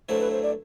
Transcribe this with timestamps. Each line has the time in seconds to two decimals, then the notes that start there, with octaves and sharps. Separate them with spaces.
0.09 G2 F#3 A3 E4 C5
0.20 B4
0.32 C5
0.43 D5